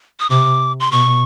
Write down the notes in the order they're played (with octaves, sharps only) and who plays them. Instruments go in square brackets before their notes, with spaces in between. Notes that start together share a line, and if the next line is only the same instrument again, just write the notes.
[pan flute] D#6
[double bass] C3 [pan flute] D6
[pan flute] C6
[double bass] B2 [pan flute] C#6